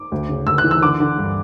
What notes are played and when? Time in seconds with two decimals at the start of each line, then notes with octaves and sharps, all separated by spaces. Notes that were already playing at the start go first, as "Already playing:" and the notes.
Already playing: D6
0.12 D2
0.29 C#3
0.46 D2 E6
0.58 F#6
0.64 E3
0.71 E6
0.82 D3 D6
1.00 D3
1.18 G2